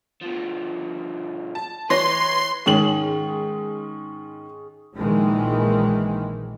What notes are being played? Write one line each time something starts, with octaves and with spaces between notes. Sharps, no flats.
B2 F3
A5
E3 B4 C#5 C6 A#6
G#2 D#3 C#4 G#4 F#7
A#1 D#3 E3 G#3